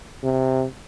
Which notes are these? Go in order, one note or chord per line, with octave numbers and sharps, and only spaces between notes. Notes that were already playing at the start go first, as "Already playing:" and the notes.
C3